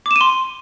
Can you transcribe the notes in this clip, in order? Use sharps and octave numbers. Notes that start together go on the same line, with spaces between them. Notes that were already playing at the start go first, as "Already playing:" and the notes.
C6 D6 D#7 E7